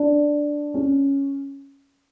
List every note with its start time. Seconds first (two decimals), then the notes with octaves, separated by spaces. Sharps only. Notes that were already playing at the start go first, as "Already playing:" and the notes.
Already playing: D4
0.74 C#4